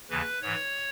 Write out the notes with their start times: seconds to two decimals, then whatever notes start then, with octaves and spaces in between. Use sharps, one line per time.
0.10 D#2 C#3 E3 B4
0.42 G#2 E3 C#5